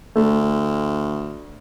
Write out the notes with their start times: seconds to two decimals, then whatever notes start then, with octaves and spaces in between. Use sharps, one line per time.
0.16 D2 A3